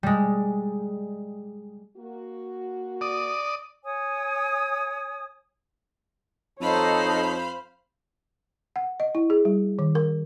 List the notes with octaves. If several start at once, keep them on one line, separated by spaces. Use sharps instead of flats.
G3 G#3
A#3 F#4
D5 D#6
C#5 G#5 D#6
F2 D#4 A4 C5 C#5 F5 B5
F#5
D#5
E4
G#4
G3
D#3
A#4